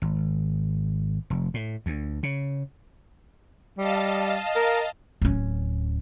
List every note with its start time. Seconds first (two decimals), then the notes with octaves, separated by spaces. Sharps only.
0.02 G#1
1.30 F1
1.54 A2
1.86 D2
2.23 C#3
3.78 G3 D#5 F5 A5
4.55 A#4
5.22 D1 C#4